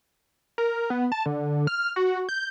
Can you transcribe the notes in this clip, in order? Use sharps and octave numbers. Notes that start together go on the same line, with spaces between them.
A#4
B3
A5
D3
F6
F#4
G6